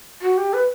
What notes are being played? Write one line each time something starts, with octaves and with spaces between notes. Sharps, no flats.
F#4
G4
B4